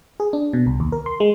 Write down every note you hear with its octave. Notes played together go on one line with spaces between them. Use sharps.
G#4
D4
B2
C2
D#2
A#4
C6
G#3